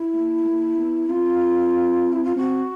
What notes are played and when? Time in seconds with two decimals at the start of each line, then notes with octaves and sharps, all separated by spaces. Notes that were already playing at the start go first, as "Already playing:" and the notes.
Already playing: E4
0.14 A#3
0.45 A#3
0.77 B3
1.09 C4 F4
2.12 E4
2.24 F4
2.36 C4 F#4